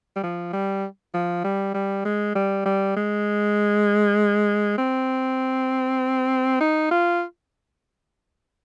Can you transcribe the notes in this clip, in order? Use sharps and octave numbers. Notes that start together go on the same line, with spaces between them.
G3
F3
G3
F3
G3
G3
G#3
G3
G3
G#3
C4
D#4
F4